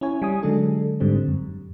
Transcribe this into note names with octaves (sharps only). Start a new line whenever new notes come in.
C#4 E4 C#5 G#5
G3 G#5 D#6
D3 F#3 G#3 D4 A4
G#2 D3 G3 C4
F#2